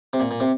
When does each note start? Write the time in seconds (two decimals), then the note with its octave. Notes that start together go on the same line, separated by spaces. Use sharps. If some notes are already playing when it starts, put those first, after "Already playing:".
0.13 C3
0.20 A#2
0.31 A#2
0.40 C3